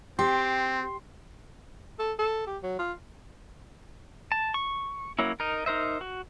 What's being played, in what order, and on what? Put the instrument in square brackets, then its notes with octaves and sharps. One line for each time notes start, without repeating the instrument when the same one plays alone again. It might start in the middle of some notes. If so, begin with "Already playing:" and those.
[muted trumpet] C4 [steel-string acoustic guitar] G4 [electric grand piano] C6
[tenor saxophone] A4
A4
G4
F#3
F4
[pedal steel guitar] A5
C#6
F#3 A#3 C#4 E4
D#4 A#4
D#4 A#4 C5 E5
F#4